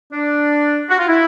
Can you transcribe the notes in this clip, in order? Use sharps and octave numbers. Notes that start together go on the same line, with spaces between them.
D4
F#4
F4
E4